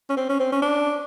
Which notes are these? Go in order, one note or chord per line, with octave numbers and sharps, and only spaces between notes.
C#4
C4
C#4
C4
C#4
D4